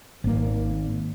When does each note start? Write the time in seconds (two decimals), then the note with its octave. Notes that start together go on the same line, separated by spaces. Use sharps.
0.24 G#1 A#3